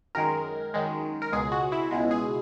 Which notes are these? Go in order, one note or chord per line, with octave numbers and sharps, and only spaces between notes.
F#2 D#3 G#3 A#4
F#2 D#3 G#3
A#4
C#2 B2 G#3 G#4
F#4
E4
C#2 B2 G#3
G#4